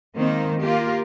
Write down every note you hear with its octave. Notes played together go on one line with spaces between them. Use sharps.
D#3 G#3 A#3 C4 D#4
A#3 F4 G4 A#4